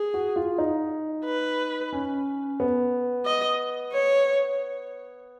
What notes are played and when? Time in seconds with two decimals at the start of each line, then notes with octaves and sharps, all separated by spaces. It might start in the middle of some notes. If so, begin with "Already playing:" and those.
Already playing: G#4
0.14 F#4
0.36 F4
0.58 D#4
1.25 B4
1.93 C#4
2.60 B3
3.26 D#5
3.92 C#5